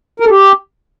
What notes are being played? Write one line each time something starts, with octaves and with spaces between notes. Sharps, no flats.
A#4
A4
G4